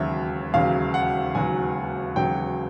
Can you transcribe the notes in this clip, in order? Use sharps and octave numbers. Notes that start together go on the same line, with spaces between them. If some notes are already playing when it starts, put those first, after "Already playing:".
Already playing: E1 D#2 C#3 F#3 E5
E1 D#2 C#3 F#3 F5
F#5
E1 D#2 C#3 F#3 G#5
E1 D#2 C#3 F#3 G5